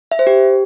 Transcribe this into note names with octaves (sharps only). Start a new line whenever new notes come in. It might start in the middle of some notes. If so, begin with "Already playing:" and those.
E5
C5
G4